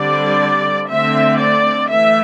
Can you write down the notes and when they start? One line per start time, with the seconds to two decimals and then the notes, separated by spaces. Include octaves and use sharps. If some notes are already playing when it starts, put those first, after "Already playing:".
Already playing: D3 G3 C4 D5
0.90 D3 A3 C4 E5
1.40 D5
1.90 E3 A3 E5